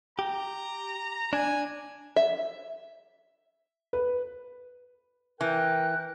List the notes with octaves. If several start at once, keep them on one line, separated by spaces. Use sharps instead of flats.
G4 A#5
D4 G#5
E5
B4
E3 A#4 G5 F#6